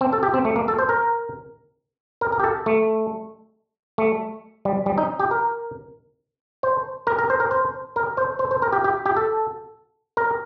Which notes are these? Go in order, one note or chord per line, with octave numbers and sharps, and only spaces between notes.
C4
A4
G4
C4
A3
A#3
A4
C5
A#4
A#4
A#4
G4
A4
A3
A3
G3
G3
D#4
G4
A#4
C5
A#4
A#4
C5
A#4
C5
A#4
C5
C5
C5
A#4
G4
G4
G4
A4
A#4